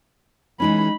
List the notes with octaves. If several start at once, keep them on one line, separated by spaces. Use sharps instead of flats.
E3 G#3 C#4 D#4 B5